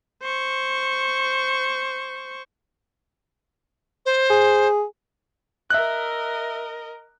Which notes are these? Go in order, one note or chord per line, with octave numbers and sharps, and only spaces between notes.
C5 C#6
C5
G#4
A#4 D#5 E5 F#6